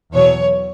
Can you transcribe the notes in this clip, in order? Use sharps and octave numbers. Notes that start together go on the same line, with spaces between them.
E2 B2 F#3 C#5